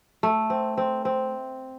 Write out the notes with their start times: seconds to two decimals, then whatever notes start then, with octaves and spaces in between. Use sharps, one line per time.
0.23 A3
0.50 C4
0.77 C4
1.05 C4